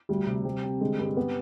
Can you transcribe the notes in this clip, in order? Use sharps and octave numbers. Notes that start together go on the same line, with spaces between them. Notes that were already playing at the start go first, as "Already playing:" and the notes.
D2 G3
C3
G3 C4
C4
D3 G#3
G2
G3 B3